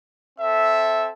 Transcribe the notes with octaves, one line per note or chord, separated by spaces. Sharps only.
C4 A4 E5